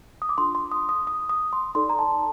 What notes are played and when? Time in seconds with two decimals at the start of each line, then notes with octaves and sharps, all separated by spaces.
0.22 D#6
0.29 D6
0.38 D4 F4 A4 C6
0.55 C6
0.71 D#6
0.89 D#6
1.07 D#6
1.29 D#6
1.53 C6
1.75 D#4 A4 D5 C6
1.89 A#5
1.99 A5